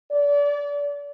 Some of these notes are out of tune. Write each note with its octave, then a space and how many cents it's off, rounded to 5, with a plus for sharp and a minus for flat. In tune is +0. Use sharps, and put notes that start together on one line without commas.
D5 -30